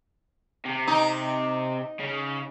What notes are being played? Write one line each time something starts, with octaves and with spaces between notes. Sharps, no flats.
C3
D#4
C#3